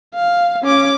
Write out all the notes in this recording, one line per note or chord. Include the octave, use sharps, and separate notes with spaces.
F5
C#4 D6